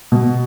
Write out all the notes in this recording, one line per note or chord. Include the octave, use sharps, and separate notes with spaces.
B2